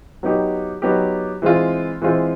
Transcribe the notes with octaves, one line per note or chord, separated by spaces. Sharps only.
F#3 B3 D#4 G4
F#3 B3 D#4 G4
E3 G#3 C4 F4
E3 G#3 C4 F4